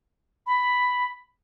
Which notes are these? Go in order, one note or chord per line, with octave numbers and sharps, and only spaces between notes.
B5